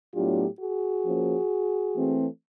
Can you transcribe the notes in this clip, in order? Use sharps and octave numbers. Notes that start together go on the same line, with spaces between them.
A2 F#3 B3 D4 F4 G4
F#4 G#4
F3 A#3 C#4
E3 A3 C4